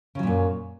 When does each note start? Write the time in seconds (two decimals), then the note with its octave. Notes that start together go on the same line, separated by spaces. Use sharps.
0.15 C#3
0.19 F#3
0.23 A#2
0.27 F#2